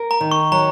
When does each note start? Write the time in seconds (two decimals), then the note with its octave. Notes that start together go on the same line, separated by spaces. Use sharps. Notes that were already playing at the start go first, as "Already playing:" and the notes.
Already playing: A#4
0.11 A#5
0.21 D#3
0.31 C#6
0.52 F#3 A#5